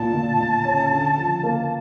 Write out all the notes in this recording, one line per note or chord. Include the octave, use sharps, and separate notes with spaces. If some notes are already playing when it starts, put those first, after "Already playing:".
Already playing: A#2 A5
A#2
A#2
C#4
D3
F3
A#3